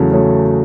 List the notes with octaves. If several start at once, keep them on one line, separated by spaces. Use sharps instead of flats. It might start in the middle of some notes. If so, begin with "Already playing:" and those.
Already playing: E2 C#3 F#3 A3
C#3 F#3 A3